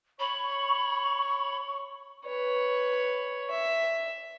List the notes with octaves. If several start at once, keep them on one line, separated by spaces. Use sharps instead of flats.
C#5 B5 C#6
B4 C#5
E5